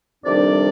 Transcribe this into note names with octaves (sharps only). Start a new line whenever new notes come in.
F2 C3 D#3 G3 D4 D5